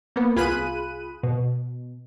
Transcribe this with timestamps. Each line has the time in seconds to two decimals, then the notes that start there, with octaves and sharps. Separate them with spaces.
0.16 A#3 B3
0.36 C2 F4 G#4 B5 F#6 D#7
1.23 B2